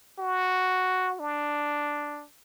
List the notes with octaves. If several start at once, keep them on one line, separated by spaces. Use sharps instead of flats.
F#4
D4